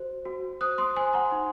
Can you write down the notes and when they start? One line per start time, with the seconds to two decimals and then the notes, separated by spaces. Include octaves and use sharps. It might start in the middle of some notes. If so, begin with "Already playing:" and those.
Already playing: F#4 C5
0.25 F#4
0.61 C5 D#6 F#6
0.78 C6 D#6
0.96 C5 G#5 C6
1.13 F#5 A#5
1.32 D#4